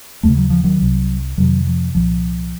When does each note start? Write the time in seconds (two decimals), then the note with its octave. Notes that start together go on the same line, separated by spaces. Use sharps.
0.23 D#2 C#3 A3
0.37 F#3
0.50 F3
0.64 D#3 F#3
0.81 C2 C3
1.38 F2 C3 D#3 F#3
1.67 F3
1.95 C2 A#2 F3